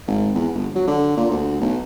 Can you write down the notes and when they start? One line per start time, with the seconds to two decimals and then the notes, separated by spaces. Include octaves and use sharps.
0.07 G#1
0.35 E2
0.54 G1
0.75 F#3
0.88 D3
1.17 A#2
1.30 D2
1.61 B1